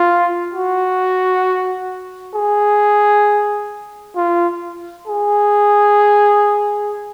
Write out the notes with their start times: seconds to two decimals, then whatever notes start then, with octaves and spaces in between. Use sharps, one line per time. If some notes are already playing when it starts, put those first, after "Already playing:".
Already playing: F4
0.54 F#4
2.35 G#4
4.16 F4
5.07 G#4